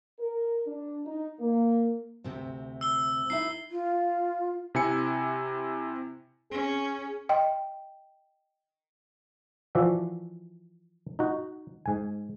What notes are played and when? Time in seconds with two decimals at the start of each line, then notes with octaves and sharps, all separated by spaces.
0.19 A#4
0.67 D4
1.05 D#4
1.40 A#3
2.24 D2 C3 C4
2.81 E6 G7
3.30 D#4 E4 E5 C7
3.71 F4
4.75 C3 E4 G#5 C#7
6.51 C#4 G#4
7.29 D#5 G5
9.75 E3 F3 F#4 D5 E5
11.19 D#4 F#4
11.86 G#2 G#5